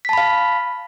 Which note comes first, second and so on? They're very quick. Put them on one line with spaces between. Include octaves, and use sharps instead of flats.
B6 A5 B5 F5